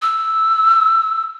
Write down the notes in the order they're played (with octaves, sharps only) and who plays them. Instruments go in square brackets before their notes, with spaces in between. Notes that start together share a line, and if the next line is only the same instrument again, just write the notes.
[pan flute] E6